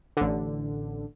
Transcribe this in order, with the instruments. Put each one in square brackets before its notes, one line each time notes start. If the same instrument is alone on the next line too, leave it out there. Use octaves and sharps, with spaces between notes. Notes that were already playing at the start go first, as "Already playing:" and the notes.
[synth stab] A1 D3